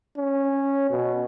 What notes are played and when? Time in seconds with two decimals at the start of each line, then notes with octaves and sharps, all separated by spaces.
0.17 C#4
0.90 B2